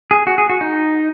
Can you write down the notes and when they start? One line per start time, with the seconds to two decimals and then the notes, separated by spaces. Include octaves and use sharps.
0.11 G#4
0.27 F#4
0.38 G#4
0.50 F#4
0.61 D#4